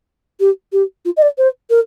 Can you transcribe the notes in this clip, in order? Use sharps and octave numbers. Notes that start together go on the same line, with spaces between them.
G4
G4
F4
D#5
D5
C5
A#4